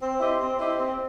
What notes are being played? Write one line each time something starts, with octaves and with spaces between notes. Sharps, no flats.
C4
E4 G4 C5 D#5
C4
E4 G4 C5 D#5
C4